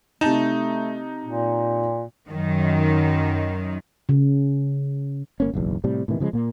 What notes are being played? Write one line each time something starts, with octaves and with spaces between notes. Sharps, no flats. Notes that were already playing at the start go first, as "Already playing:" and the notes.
C3 A3 D#4 A5 E7
A#2
F#2 D#3
C#3
G1 A#3 C#4
F#1 B1 E2
A2 C3 G3
A2 C3 D#3 E3
C#3 F3 G3 G#3
A#2 A#3